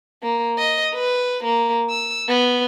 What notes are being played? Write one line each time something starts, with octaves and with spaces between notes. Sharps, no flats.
A#3
D#5
B4
A#3
E6
B3